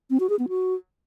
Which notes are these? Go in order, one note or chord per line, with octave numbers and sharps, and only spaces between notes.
C4
F#4
G#4
B3
F#4